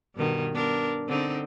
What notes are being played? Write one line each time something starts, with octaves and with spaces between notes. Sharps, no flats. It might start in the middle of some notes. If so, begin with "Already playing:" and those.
G2 B2 D#3
B3 D4 A#4
D3 C4 D#4